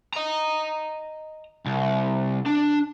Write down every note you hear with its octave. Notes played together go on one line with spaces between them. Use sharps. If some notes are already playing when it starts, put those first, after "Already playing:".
D#5 A#5
C2
D4